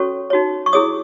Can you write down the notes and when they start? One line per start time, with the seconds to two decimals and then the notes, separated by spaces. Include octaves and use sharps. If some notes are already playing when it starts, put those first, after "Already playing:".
Already playing: C#4 F#4 A4 C#5 C#6
0.30 D#4 F#4 C#5
0.66 C#6
0.73 E4 G#4 C#5 D#6